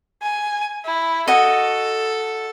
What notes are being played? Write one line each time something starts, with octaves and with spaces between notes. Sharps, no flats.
G#5
E4
F#4 A4 D#5